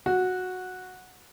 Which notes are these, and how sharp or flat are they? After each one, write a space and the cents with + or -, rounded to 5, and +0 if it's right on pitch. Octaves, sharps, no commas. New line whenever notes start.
F#4 -10